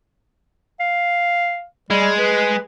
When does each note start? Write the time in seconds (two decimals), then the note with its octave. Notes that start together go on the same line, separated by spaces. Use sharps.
0.80 F5
1.90 G3 G#3
2.19 B4